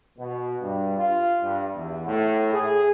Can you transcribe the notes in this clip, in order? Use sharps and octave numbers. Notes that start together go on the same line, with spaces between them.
B2
G2
F4
G2
E2
A2
G#4